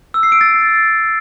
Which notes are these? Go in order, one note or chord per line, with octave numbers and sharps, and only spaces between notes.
E6
C7
D7
A6